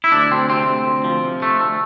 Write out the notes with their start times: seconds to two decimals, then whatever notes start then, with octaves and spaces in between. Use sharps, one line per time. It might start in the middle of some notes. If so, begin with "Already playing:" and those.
0.04 E4
0.12 D2 D4
0.31 D2 C4
0.49 C3 C4
0.69 D2
0.87 D2
1.04 F3
1.23 C3
1.41 F3 A3
1.60 D2 A3